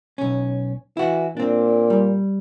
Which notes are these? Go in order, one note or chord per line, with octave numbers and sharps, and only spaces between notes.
B1 C#4
E3 E4 F#4
A#2 C4 D4
G3